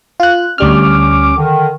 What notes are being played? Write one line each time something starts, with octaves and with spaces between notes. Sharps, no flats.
F4 F#6
D2 G3 C#4 D6 F6
D3 D#3